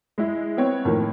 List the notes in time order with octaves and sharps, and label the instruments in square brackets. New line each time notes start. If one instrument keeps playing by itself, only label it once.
[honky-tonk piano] G#3 E4
B3 C4 C#5
A2 D#3 F3 A#3